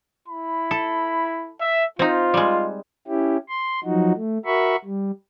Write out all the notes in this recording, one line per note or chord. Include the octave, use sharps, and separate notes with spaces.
E4 B5
A4
E5
C4 D#4 F4
G3 G#3
C#4 E4 G4
C6
F3 F#3 D#4 F#4
A3
F#4 A#4 E5 B5 C#6
G3